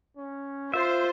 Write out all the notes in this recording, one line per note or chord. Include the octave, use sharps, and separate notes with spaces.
C#4
F4 C5 E5